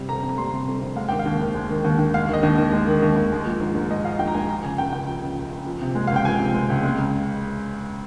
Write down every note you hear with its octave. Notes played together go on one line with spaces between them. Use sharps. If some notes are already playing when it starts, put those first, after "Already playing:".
Already playing: C3 G3
F2 A#5
F2
A#5
G3 C6
C3
F2
F2
G#3 F5
D#3 G5
F5
D#2
D#2
G#3
D#3
D#2
D#2
G#3 F5
D#3 D#5
D#2
D#2
G#3
D#3
D#2
D#2
G#3
F3
G#2
G#2
G#3 D#5
F3 F5
G#2 G5
A#5
G#2 G#5
F3 A#5
C#3 G#5
C#2 G5
C#2 G5
F3
C#3
C#2
C#2
F3
C3
G#3
F5
C#2 G5
F3 G#5
C3
G#3
C#2
G#3
C#3